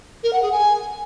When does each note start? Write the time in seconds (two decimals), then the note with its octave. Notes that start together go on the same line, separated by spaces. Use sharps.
0.23 A#4
0.33 F#5
0.42 G#4
0.52 G#5